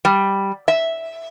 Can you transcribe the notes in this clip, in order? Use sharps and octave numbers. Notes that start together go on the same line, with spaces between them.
G3
E5